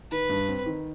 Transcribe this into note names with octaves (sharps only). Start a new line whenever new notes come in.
D#3 B4
G2
C4
D#3